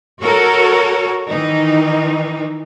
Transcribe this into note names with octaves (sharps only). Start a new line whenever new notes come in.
F#4 A4 A#4 C#5
D#3 E3 D#4